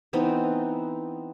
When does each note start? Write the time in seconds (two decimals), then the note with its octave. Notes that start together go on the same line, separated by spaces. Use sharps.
0.13 E3 B3 C4 D#4